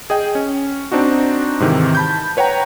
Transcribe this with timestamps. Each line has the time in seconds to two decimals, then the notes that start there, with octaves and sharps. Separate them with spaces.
0.10 G#4 D#5 G5
0.35 C#4
0.92 C4 D4 D#4 F#4
1.60 G#2 C3 D#3 E3
1.95 A5 B5 G6
2.37 B4 C#5 F#5 G5 A#5